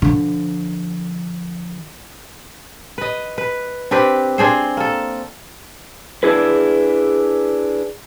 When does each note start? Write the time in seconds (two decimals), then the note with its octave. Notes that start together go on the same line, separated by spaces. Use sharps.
0.02 D3 F3
2.98 B4 D#5
3.38 B4
3.91 C4 D4 G4 B4
4.38 C4 D4 G#4 C5
4.77 A#3 A4
6.23 D4 E4 G#4 B4